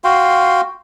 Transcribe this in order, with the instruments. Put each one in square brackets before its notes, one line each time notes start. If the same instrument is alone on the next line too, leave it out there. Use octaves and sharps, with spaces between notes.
[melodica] F#4 F5 G5 C6